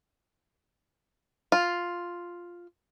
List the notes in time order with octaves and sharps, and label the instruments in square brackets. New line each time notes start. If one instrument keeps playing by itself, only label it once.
[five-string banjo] F4